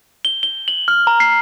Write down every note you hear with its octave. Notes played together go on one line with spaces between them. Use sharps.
G7
G7
F#7
F6
A#5
C7